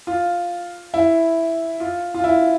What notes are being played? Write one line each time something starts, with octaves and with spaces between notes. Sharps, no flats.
F4
E4
F4
F4
E4